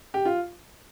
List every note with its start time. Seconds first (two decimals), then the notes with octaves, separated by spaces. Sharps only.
0.14 G4
0.25 F4